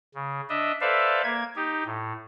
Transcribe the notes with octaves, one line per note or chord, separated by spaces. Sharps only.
C#3
D4 D#5 E5
A4 B4 C5 D5 E5 F5
A#3 G#6
D#4 G4
A2